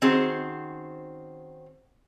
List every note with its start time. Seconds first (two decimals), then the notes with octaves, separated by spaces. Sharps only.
0.02 D#3 C4 C#4 F#4 G#4 C5